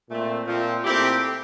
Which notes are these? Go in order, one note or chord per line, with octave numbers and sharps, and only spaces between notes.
A#2 A3 C4
A#2 F3 C4
A#2 A3 C4 E4 G4